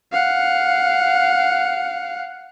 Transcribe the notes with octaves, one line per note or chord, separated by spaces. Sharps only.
F5 F#5